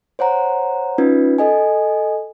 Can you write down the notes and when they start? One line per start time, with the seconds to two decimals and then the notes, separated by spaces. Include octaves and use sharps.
0.19 C5 C#5 F#5 A#5
0.98 C#4 D#4 F4 B4
1.38 A4 D#5 G#5